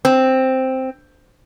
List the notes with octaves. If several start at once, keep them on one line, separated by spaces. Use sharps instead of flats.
C4